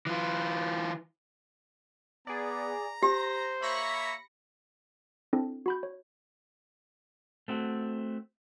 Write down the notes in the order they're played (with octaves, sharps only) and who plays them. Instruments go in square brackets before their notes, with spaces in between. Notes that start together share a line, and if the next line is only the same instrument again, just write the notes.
[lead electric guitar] E3 F4
[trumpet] B3 [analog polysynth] G#4 D5 [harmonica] A#5
[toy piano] G4 [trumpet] C5 [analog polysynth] A#6
[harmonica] A#3 C#5 E5 [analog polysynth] B5 A#6 C#7
[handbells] C4 D4 E4 A4
F#4 B5 G6
C#5
[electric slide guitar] A3 C4 F#4